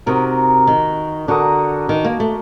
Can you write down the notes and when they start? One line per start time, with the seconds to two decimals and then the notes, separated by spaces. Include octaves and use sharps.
0.06 C3 D#4 F#4 A#4
0.67 D#3
1.28 D3 D4 F#4 A#4 D#5
1.89 D#3
2.05 A#3
2.20 A3